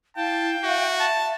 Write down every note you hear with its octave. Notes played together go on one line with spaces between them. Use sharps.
E4 F5 G5 A5
F#4 E5
A5